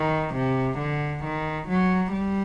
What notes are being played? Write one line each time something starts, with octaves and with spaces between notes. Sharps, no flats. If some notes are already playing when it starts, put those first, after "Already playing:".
Already playing: D#3
C3
D3
D#3
F#3
G3